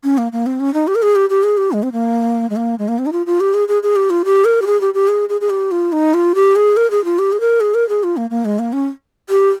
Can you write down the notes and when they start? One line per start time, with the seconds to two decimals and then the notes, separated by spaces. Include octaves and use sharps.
0.04 C#4
0.18 A#3
0.32 A#3
0.46 C4
0.60 C#4
0.74 D#4
0.87 G4
0.95 A#4
1.02 G#4
1.16 G4
1.30 G4
1.43 G#4
1.57 G4
1.72 G#3
1.83 C4
1.92 A#3
2.50 G#3
2.56 A#3
2.79 G#3
2.88 A#3
2.99 C4
3.06 D#4
3.12 F4
3.26 F4
3.40 G4
3.54 G#4
3.68 G#4
3.83 G#4
3.96 G4
4.10 F4
4.25 G4
4.45 A#4
4.62 G4
4.66 G#4
4.81 G4
4.94 G4
5.08 G#4
5.29 G#4
5.41 G#4
5.50 G4
5.71 F4
5.92 D#4
6.14 F4
6.35 G4
6.56 G#4
6.77 A#4
6.91 G#4
7.05 F4
7.19 G4
7.32 G#4
7.40 A#4
7.60 G#4
7.74 A#4
7.89 G#4
8.03 F4
8.17 A#3
8.30 A#3
8.45 G#3
8.59 A#3
8.73 C#4
9.30 G4